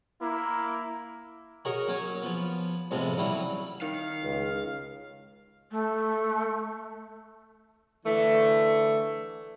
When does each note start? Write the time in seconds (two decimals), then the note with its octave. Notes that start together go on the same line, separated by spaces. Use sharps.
0.22 A#3 E4
1.65 F#4 G#4 A#4 C#5 D#5
1.88 F#3 A#3 C#4 C#5 G#5
2.22 F3 B3
2.91 F2 A2 C3 F3 G#3 B3
3.18 E3 F#3 G3 C#4 D#4 E4
3.82 D#3 F5
4.23 C#2
5.71 A3
8.05 D3 E3 A3